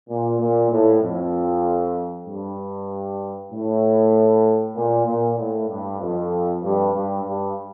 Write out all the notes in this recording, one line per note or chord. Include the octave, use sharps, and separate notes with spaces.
A#2
A#2
A2
F2
G2
A2
A#2
A#2
A2
G2
F2
G2
G2
G2